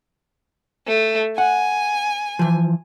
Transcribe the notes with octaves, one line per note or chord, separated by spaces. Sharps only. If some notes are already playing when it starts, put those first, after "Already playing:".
A3
F#5 G#5
E3 F3